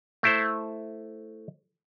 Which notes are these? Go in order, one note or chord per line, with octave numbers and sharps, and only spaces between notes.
A3 E4 C5